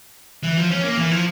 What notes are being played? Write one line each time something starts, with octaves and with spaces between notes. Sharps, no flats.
E3
F3
C#4
A#3
E3
F3